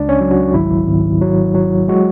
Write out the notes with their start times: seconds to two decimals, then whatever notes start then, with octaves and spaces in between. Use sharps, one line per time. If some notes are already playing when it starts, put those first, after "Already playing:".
Already playing: C#2 D4 D5
0.09 C#4 C#5
0.20 F#3
0.31 F#4
0.54 G#1 E4
0.87 G#1
1.21 F#3
1.55 F#3
1.88 G#3 F#4